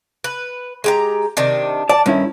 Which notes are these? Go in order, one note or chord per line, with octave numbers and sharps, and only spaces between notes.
B4
G#3 G4 A#5
C3 D#3 D4
D5 A5
G2 D#3 C#4 E4